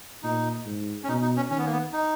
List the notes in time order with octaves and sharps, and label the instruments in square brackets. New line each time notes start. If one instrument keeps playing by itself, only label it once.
[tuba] A#2 [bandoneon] D#4
[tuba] G#2
[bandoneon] C#4
[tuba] B2 [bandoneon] D#4
[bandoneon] D#4
C#4
[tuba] D#3 [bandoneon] C#4
[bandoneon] B3
A#3
B3
D#4